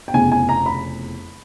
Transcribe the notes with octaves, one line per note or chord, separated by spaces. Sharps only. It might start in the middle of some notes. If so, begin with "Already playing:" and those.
G5
F1 E2 C#3 G#5
G#5
A#5
B5